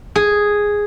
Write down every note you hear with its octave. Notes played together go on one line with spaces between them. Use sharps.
G#4